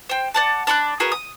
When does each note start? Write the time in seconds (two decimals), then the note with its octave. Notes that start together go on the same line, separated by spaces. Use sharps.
0.09 C5 G5
0.34 D5 F#5 A5
0.67 D4 B5 C#6 F#6
1.00 F#4 G#4 A#4 B4
1.12 D#6